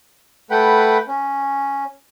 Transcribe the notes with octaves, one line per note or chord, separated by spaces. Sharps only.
A3 B4 F#5 G5 B5
C#4